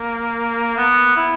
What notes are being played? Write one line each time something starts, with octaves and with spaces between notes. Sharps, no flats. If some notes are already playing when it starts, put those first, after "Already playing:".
Already playing: A#3
B3
E4